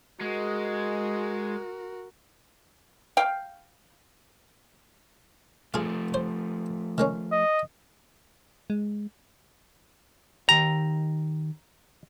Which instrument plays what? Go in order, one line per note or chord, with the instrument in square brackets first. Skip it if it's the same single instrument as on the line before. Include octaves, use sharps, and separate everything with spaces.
[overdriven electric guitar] G#3 [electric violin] F#4 A#4
[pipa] F5 G5
[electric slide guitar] F3 A3 [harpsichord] F4 G#4
[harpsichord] C5
D#3 G#3 C#4
[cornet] D#5
[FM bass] G#3
[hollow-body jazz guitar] D#3 G4 G5 [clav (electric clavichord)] A#5